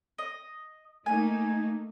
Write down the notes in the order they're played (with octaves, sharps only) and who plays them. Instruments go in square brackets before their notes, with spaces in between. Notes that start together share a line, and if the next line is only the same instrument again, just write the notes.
[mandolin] D#5
[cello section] A3 A#3 D#4 [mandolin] G#5